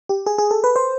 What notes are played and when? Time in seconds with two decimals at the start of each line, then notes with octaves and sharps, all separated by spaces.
0.09 G4
0.26 G#4
0.38 G#4
0.51 A4
0.64 B4
0.76 C5